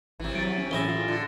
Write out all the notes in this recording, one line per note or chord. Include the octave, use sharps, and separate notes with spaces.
G#1 C3 E3
F#3 A6 D7
C#4
A1 E4 G#4 A#6 E7 G7
F4
D3